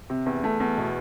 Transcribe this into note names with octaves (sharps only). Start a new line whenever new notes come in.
C3
E2
A3
E2
B2